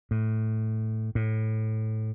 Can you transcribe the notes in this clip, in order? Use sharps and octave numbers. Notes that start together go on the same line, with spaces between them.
A2
A2